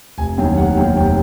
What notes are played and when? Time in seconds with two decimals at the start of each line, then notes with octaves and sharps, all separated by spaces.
0.18 F1 G#5
0.37 D#2 D#3 F#3 G5
0.57 F1 F#5
0.77 D#2 D#3 F#3 G5
0.96 F1 G5